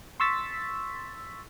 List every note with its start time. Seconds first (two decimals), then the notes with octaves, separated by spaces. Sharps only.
0.20 C6 C#6 E6 A6 B6